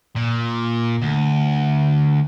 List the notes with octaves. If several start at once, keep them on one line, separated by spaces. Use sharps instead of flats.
A#2
D2